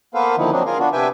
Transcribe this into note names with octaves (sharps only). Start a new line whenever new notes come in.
A#3 B3 A4 B4 C5 F5
D3 D#3 F3 A#3 D#4 E4
F3 F#3 A#3 C4 D4 D#4
F4 G#4 A#4 F5
B3 D4 F4 F#4
C3 D4 B4 E5 G5 G#5